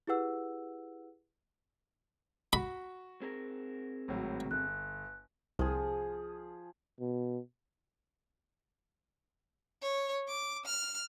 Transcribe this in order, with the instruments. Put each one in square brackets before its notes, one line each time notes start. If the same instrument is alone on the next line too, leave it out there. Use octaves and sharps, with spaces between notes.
[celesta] E4 G4 G#4 B4 F#5 E6
[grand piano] F#4 [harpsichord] B5
[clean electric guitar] C4 G#4 A#4
[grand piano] G#1 A2 F#3
[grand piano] G1 [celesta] F#6
[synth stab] C2 [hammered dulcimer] F3 G#4
[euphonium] B2
[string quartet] C#5
D6
F6